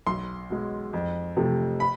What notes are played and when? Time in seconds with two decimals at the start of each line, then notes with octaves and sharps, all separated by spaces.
0.06 B1 C6
0.50 B2 G#3
0.93 F2
1.37 C3 F3 A3
1.80 B5